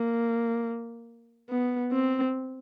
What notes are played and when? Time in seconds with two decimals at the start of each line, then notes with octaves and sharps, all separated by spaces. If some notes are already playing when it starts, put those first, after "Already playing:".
Already playing: A#3
1.50 B3
1.92 C4